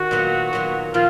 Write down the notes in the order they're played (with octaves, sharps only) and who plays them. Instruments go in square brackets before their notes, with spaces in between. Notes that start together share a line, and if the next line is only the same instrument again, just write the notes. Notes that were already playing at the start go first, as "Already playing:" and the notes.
Already playing: [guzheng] D#3 [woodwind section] F#4
[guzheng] A#2 F#3 B3
A#2 F#3 B3
[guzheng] A#2 F3 [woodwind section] F4